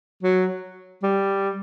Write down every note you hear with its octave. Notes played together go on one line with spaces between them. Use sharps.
F#3
G3